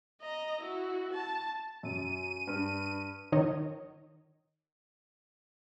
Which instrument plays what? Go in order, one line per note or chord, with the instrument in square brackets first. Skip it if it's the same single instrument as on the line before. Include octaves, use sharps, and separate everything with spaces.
[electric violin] D#5 A#5
E4 F#4
A5
[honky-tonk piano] F#2 [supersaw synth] D#7
[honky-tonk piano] G2
[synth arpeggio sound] D#3 C#5 D#5